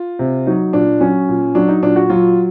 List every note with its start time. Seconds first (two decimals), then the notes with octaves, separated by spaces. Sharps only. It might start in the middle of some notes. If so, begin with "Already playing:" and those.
Already playing: F4
0.19 C3
0.46 F#3 D#4
0.73 A#2 D4
1.01 F#3 C#4
1.29 A#2
1.55 F#3 D4
1.69 D#4
1.82 A#2 D4
1.96 F#4
2.10 F#3 F4